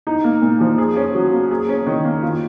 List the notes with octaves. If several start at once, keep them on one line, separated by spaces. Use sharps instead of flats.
D#4
A#3
A#2
F3
G#4
C#4
F#3
A#3
G#4
C#4
D#3
A#3
F4